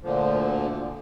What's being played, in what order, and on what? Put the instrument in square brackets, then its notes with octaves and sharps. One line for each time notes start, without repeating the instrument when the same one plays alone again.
[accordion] D2 A#2 D3 F3